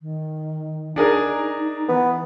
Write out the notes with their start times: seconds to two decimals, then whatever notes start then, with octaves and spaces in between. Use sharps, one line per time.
0.01 D#3
0.96 D4 D#4 G#4 A#4
1.89 E3 B3